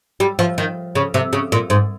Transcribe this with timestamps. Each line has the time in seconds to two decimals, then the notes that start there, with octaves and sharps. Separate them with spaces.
0.20 G3
0.39 F3
0.58 D#3
0.95 C#3
1.14 C3
1.33 C#3
1.52 A#2
1.70 G#2